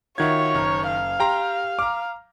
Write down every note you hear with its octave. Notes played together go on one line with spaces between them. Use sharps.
D#3 F4 F#4 C#5 E5 G#6
F#1 A#5 F6
F5
G4 G5 A#5 C6
A#5 D6 F6